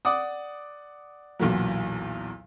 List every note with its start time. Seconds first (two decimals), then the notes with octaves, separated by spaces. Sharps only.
0.05 D5 F#5 D6 D#6
1.39 B1 E2 A#2 E3 F#3